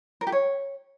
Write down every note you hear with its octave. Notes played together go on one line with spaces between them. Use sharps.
A#4
G4
C#5